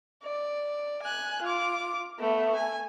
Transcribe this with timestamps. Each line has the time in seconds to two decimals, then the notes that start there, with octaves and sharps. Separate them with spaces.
0.23 D5
1.02 G#5 F#6
1.42 F4 D6
2.19 A3 B3
2.54 G#5